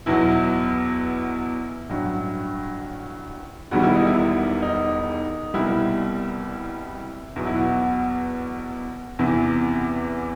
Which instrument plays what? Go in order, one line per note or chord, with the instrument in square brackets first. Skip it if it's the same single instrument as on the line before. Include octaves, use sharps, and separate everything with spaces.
[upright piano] E2 B2 F#3 E4
A1 G2 F#3
E1 E2 D#3 G3 F#4
E4
D#4
E4
D#4
C2 B2 G3 E4
E2 B2 F#3 F#4
E4
F#4
E2 C3 E3